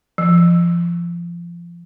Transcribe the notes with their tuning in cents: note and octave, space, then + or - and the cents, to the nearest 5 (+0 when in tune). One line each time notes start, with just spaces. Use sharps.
F3 -25